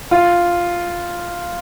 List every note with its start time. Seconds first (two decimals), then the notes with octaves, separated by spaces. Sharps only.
0.11 F4